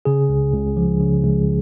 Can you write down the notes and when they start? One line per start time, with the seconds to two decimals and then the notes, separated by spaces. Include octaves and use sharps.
0.05 C#3 G#4
0.29 C#2
0.53 C#2
0.77 F3
1.00 C#3
1.24 C#2